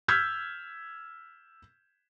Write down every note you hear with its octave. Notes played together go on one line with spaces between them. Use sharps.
E6 F6 G6 G#6 B6